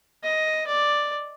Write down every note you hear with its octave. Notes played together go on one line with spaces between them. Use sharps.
D#5
D5